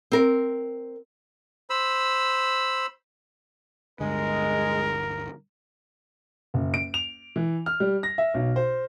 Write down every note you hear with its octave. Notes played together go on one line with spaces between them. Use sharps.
C4 A#4
C5 B5 E6
D1 G2 D3 G#3 A#4
F#1
D7
F7
E3
F6
G3
A#6
E5
B1
C5